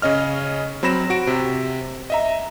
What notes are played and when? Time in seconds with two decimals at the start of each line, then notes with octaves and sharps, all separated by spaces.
0.02 C#3 C#4 D#5 F6
0.83 F#3 C4 B5 A#6 E7
1.10 F#4 D7
1.27 C3
2.10 D#5 E5 A#5